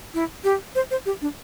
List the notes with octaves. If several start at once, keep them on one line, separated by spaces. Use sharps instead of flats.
E4
G4
C5
C5
G4
D4